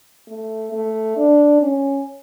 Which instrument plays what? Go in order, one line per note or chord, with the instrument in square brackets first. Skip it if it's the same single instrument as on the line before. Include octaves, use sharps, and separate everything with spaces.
[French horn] A3
A3
D4
C#4